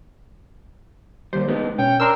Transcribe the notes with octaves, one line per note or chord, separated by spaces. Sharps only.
D#2 G3 C5
G#3 B3 D#4
B2 C#4 G5
D4 A#4 A#5 C6 E6